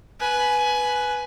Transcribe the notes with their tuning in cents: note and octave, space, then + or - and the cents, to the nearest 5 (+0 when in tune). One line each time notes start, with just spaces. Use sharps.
B4 +0 G#5 +20